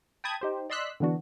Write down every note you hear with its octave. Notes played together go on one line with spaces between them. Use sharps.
G5 A5 B5 D#6 G#6
D#4 G4 C5
D5 D#5 C6 E6 F#6 B6
D3 E3 B3 D4 F#4